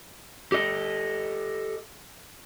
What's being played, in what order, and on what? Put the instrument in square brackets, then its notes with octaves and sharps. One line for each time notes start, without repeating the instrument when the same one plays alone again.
[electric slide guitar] G4 A4 D#5